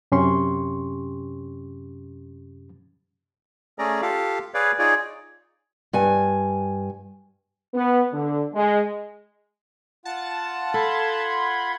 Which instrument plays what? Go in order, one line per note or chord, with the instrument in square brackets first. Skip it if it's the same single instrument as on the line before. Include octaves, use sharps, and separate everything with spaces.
[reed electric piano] F#2 C3 C#4 G4 C6 C#6
[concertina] A3 C#4 G#4 D5 A#5
F4 G4 A4 F5
G#4 B4 C#5 D5 F5
D#4 F4 G#4 C#5 D5
[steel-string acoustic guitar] G2 G#5
[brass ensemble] B3
D3
G#3
[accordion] F4 F#5 [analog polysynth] A5
[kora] A4 [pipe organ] B5 C6 G#6